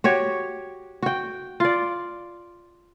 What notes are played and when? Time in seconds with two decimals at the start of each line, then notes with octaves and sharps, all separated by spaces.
0.04 F#4 G4 C#5
1.02 F#4 G5
1.60 F4 D5